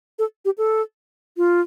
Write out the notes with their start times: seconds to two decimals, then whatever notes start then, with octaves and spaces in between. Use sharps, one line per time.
0.19 A4
0.45 G4
0.58 A4
1.37 F4